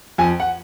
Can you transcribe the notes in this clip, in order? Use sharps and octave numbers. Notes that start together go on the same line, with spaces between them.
F2 G#5
F#5